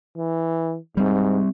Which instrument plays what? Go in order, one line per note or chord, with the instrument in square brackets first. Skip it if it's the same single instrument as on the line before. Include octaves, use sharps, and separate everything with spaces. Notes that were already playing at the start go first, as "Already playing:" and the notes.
[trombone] E3
[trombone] G#2 [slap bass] G3 C4